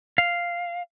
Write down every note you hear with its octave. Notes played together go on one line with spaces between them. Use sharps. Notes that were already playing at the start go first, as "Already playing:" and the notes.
F5